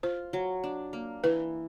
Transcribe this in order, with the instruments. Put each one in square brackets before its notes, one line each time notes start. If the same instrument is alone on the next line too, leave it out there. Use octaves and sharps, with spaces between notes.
[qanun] F4 [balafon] C5
[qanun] F#3
D4
A#3
[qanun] E3 [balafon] B4